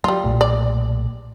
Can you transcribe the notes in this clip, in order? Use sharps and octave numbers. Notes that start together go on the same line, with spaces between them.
F#3 G3 F4
B1 A#2 A3
D5